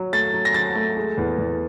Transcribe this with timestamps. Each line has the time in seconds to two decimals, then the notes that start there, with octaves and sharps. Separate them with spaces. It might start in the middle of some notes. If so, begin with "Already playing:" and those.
Already playing: F#3
0.13 A3 A6
0.34 F#3
0.45 A#6
0.54 F#3 A6
0.75 A3
0.97 G#3
1.18 E2
1.38 E2